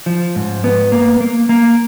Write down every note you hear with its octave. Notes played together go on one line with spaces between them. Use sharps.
F3
G#2
B3
A#3
A#3
A#3